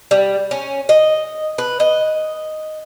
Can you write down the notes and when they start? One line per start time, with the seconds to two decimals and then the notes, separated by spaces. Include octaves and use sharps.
0.11 G3
0.51 C#4
0.89 D#5
1.58 B4
1.80 D#5